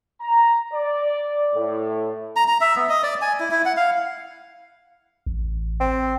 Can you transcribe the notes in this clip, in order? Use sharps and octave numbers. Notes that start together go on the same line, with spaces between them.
A#5
D5
A2
A#5
A#5
E5
B3
D#5
D5
G#5
E4
E4
F#5
F5
A1
C4